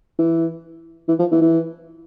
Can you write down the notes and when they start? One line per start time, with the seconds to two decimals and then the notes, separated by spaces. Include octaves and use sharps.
0.19 E3
1.09 E3
1.19 F3
1.32 E3
1.42 E3